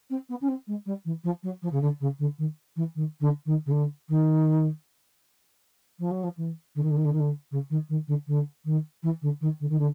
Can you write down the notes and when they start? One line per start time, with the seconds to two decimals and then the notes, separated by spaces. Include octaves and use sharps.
0.10 C4
0.29 B3
0.41 C#4
0.48 C4
0.67 G#3
0.86 G3
1.05 E3
1.24 F3
1.43 F#3
1.62 F3
1.72 C#3
1.81 D3
2.00 C#3
2.19 D3
2.38 D#3
2.76 E3
2.95 D#3
3.20 D3
3.45 D#3
3.66 C#3
3.71 D3
4.09 D#3
5.99 F3
6.11 F#3
6.23 F3
6.37 E3
6.75 D3
6.82 D#3
6.90 D3
6.96 D#3
7.04 D3
7.12 D#3
7.19 D3
7.51 C#3
7.70 D#3
7.89 D#3
8.07 D3
8.27 D3
8.64 D#3
9.03 E3
9.21 D3
9.41 D#3
9.60 D3
9.69 D#3
9.79 D3